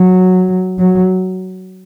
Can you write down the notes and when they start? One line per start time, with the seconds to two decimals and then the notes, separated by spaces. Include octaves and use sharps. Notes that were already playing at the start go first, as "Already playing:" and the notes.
Already playing: F#3
0.79 F#3